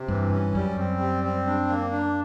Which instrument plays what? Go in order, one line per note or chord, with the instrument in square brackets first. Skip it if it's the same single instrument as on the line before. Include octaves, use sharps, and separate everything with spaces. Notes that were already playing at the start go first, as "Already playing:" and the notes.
Already playing: [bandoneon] C3
[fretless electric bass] G2 [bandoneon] E3
[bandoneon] C#4
[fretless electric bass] F#2 [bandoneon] G3
[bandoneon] C4
G3
C4
D4
A#3
D4